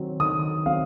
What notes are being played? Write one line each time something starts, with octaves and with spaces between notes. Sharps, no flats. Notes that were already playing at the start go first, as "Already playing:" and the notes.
Already playing: D#3 F#3 C4
D#3 D#6
F#3 C4 F5